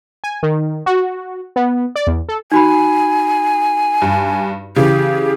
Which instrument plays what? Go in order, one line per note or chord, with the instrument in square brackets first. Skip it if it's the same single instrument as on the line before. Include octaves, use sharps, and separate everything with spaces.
[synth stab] G#5
D#3
F#4
B3
D5
E2
A4
[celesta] D#4 F#4 B5 [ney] G#5
[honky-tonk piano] G2
[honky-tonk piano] C#3 E3 [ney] G4